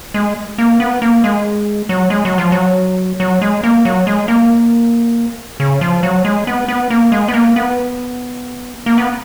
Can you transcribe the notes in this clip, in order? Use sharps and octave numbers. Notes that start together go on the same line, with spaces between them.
G#3
A#3
B3
A#3
G#3
F#3
G#3
F#3
F3
F#3
F#3
G#3
A#3
F#3
G#3
A#3
C#3
F3
F#3
G#3
B3
B3
A#3
G#3
B3
A#3
B3
A#3
B3